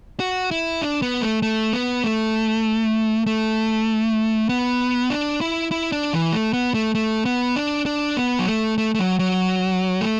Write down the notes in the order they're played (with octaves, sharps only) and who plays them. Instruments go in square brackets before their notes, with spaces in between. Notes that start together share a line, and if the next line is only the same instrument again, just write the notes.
[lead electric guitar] F#4
E4
D4
B3
A3
A3
B3
A3
A3
B3
D4
E4
E4
D4
E3
A3
B3
A3
A3
B3
D4
D4
B3
F#3
A3
A3
A3
F#3
F#3
A3